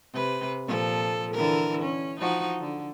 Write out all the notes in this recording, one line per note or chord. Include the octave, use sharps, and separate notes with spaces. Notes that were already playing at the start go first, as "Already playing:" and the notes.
C3 B4
A#2 F3 A4
D3 E3 A#4
C#4
F3 D#4 F#4
D3